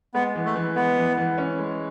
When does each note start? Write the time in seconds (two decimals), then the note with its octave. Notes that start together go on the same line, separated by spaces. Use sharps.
0.14 G#3 B3
0.35 E3
0.45 A3
0.56 E3
0.76 G#3 B3
0.97 E3
1.17 E3
1.38 C#4
1.59 G#3